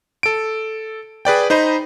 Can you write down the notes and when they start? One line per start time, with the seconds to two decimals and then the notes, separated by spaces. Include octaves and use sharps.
0.23 A4 D7
1.25 G#4 B4 D5 G5
1.50 D#4 C5 D#5 B5